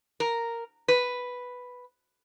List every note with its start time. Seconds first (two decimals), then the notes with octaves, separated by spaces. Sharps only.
0.20 A#4
0.88 B4